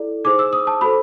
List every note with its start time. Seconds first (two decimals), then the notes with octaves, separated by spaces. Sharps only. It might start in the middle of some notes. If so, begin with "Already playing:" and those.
Already playing: E4 A4 D5
0.24 D#4 G#4 C5 D6
0.39 E6
0.53 D#6
0.67 A5
0.81 F#4 A4 C5 B5